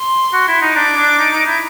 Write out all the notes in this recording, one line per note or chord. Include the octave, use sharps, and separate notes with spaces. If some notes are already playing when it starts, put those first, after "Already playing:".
Already playing: C6
F#4
E4
D#4
D4 D6
D4
D#4
D#4
E4